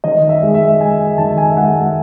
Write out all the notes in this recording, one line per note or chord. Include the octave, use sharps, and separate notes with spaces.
D#3 D#5
E5
G#3
E5
G#3 G#5
D#3 A5
G#5
E5
G#3 F#5